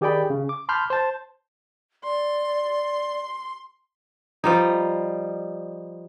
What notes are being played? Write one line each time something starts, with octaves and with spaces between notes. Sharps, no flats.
D#3 G4 G#4 D5 G5 B5
C#3
D6
A5 B5 C6 D6 F6 G6
C5 A5
D5 C6
F3 G3 D#4